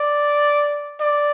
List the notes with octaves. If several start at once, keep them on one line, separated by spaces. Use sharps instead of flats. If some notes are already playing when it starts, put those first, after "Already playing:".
Already playing: D5
D5